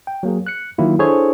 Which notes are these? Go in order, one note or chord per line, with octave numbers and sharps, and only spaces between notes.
G5
F#3 A#3 G#4
F#6 C#7
D#3 F#3 A#3 E4 F4
D4 E4 G#4 A4 C5 C#5